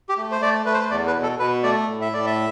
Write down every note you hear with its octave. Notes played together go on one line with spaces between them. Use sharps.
G4
A3
C5
A3 D5
A3 B4
C5
B4
E2 D5
B4
B2
A4
B2 B4
A3 D5
A2
E5
A2 D5
E5